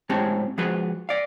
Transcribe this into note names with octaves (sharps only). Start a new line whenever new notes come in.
A2 G#3 C4 C#4 G4 A5
F3 G#3 F#4 G#4 B4
D5 F5